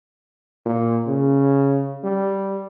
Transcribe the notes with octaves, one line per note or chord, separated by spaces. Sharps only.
A#2
C#3
G3